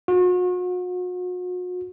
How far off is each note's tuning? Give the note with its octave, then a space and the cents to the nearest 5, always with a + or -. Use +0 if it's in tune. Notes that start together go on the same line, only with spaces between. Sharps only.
F#4 -40